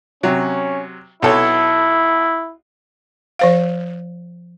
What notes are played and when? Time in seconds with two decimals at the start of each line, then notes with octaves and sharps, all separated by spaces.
0.23 C3 F#3 C#4
1.22 B1 E4 A4 C#5
3.39 F3 C5 F5